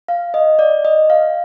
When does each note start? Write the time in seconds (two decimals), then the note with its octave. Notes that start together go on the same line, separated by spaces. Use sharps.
0.08 F5
0.34 D#5
0.59 D5
0.85 D#5
1.10 F5